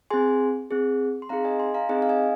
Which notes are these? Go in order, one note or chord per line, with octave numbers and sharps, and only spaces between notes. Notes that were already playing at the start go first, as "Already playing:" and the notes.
C4 G#4 G#5 C6
C4 G#4
C6
C4 D#4 G#4 F5 A#5
D#5 G#5
G#5 C6
F5 A#5
C4 D#4 G#4 D#5 G#5
F5
D#5 G#5